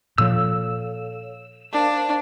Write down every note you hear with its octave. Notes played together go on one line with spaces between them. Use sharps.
A#2 F3 A4 C#5 F5 E6
D4 A#4 C5 F5